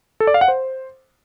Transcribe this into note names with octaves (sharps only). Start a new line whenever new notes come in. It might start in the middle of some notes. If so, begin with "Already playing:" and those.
A4
D5
F5
F#5
C5